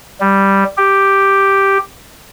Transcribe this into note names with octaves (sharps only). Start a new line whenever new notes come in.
G3
G4